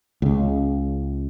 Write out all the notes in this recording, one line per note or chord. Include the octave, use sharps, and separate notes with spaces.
C#2 C#3